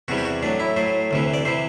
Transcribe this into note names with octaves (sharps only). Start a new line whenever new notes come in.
E2 C3 E3 G3 F#4
G4
F#4
A2 F#3 D4
E4
A2 F#3 C5
D2 C3 E3
D5
C3 E3 C5